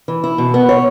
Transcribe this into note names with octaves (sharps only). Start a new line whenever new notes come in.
E3
E4
B2
B3
C#5